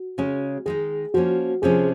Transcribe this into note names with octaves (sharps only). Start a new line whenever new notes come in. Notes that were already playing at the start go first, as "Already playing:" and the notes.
Already playing: F#4
C#3 G#3 C#4
D#3 G#3 D#4 G#4
F3 A#3 C#4 F#4
C3 F3 G#3 C#4 G#4